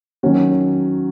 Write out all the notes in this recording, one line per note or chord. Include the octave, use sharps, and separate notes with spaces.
D#3 F#3 C#4 F#4